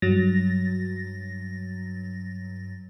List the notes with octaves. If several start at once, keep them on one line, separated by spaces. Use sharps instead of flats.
G2 F#3 A6 A#6